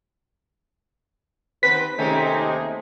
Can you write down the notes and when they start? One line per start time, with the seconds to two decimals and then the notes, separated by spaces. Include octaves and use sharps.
1.63 D#2 C4 B4 B6
1.98 D#2 C3 D#3 A3 C4 C#4 D#4 G#4